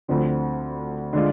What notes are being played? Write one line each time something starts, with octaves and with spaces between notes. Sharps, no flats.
D2 D3 F3 C4
D3 G#3 D4 F4